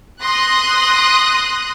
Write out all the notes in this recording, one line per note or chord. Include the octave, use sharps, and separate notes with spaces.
C6 D#6 F#6 A#6